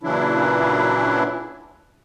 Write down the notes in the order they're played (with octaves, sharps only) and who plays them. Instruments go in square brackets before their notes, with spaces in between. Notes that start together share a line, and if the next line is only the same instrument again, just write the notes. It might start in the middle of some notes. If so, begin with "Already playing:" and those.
[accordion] A#2 C#3 E3 F#3 D4 E4